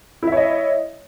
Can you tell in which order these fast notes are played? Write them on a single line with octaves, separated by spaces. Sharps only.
E4 E5 C#5 D#5